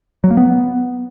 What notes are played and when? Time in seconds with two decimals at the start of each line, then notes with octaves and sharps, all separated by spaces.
0.24 F#3
0.30 A#3
0.37 B3